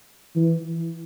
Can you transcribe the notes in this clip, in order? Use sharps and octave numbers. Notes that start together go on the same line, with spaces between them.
E3